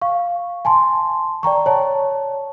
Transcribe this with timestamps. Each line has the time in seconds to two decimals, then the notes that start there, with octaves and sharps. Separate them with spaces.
0.02 F5 C#6
0.65 G#5 A5 C6
1.43 D5 G5 A#5 C#6
1.66 C#5 A5